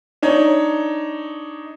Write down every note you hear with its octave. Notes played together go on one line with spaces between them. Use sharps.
D4 D#4 C#5